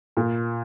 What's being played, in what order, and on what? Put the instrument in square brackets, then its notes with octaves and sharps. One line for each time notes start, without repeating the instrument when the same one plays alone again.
[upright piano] A#2